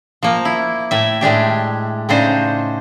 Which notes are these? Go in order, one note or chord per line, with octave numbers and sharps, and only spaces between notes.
F3 A#3
E4
A2 E5
A2 G#3 D4 G4
A2 C#3 D4 D#4 C5